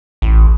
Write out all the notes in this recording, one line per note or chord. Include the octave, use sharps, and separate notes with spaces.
A1